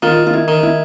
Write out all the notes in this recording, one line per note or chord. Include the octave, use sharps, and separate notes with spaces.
D#3 F4
F4
E4
D#3
E4